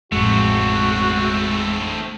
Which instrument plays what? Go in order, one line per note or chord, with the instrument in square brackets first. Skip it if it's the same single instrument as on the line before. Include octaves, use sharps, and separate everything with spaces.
[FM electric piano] A1 F2 [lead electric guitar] G#3 [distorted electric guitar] A3 C4 [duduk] F#4